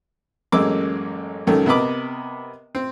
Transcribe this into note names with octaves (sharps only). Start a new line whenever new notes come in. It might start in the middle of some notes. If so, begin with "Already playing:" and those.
A1 F#2 G#3 A#3 D6 E6
C#2 F#2 D#3 A4
C3 B3 A#4 D#5 B5 D6
C4